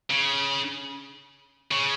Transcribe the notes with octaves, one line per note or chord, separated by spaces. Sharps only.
C#3
C#3